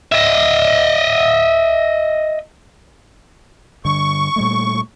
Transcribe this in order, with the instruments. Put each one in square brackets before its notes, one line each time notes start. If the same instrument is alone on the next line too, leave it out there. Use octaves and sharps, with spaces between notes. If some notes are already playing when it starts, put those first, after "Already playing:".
[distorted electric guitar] D#5 E5
[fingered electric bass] G2 D3 [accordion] C#6
[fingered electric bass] A#2 G3 A3